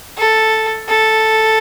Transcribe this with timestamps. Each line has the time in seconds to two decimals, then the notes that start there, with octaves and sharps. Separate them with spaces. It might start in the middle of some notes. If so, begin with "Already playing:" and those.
0.17 A4
0.89 A4